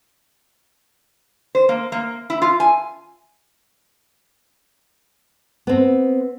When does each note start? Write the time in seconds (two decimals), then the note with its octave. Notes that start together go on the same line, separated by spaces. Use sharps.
1.55 C5
1.69 A#3
1.92 A#3
2.30 E4
2.42 F4
2.60 G#5
5.67 B3 C4